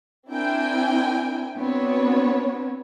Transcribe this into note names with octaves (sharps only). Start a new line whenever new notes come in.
C4 D4 E4 A#4 G5 G#5
B3 C4 D4 F#4 B4 C#5